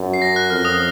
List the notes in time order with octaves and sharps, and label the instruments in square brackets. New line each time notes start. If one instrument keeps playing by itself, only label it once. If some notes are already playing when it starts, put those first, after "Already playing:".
Already playing: [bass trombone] F#2
[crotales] C7
A#6
F#6
[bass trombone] F2 [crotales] F6
[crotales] D#6